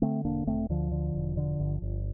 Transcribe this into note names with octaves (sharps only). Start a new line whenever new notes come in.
D3 A3 C4
E1 A#3 D4
E1 A3 C4
D2 D3 F3
D3
E1
D3
G1
G1